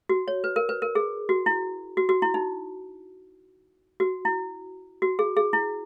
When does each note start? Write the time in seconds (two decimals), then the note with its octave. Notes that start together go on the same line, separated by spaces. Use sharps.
0.09 F#4
0.28 C#5
0.44 B4
0.56 A#4
0.69 B4
0.82 A#4
0.95 G#4
1.29 F#4
1.46 E4
1.97 F#4
2.09 F#4
2.22 E4
2.34 D#4
4.00 F#4
4.25 E4
5.02 F#4
5.19 G#4
5.37 G#4
5.53 E4